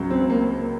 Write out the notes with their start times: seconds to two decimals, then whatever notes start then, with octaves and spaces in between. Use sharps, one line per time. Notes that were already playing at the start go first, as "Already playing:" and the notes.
Already playing: C#2 C#3 F#3
0.10 C4
0.30 A#3